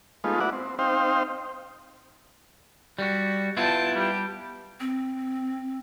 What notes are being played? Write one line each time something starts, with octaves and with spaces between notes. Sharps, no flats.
G#3 A3 B3 D#4 F4
B3 E4 F#4 D5 F#5
C4
C4 D#4 C5 F5 G5
G3 F#4
B3 E4 F4 G5 A5
G3 G5
C4